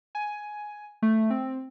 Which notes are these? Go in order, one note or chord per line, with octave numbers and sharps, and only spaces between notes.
G#5
A3
C4